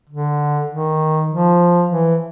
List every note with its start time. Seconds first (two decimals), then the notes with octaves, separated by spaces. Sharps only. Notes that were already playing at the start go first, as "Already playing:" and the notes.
0.09 D3
0.69 D#3
1.29 F3
1.89 E3